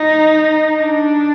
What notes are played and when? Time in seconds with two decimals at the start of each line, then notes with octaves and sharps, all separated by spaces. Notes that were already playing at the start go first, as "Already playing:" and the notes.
Already playing: D#4
0.78 D4